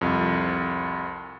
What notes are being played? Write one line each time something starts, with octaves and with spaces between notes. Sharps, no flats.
C2 F2